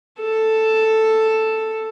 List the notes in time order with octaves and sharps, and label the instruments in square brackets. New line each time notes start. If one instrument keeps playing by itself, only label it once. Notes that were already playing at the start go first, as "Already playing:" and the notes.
[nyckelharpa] A4